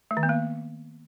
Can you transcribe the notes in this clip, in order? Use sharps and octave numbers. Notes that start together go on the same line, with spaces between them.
A3
D#3
B3
A#3